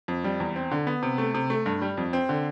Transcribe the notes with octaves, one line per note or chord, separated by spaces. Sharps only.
F2
G3
E2
C4
D3
B3
C3
A3
C3
A3
G2
G3
F2
C4
D3